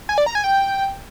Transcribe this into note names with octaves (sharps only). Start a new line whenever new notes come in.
G#5
D5
A#5
G#5
G5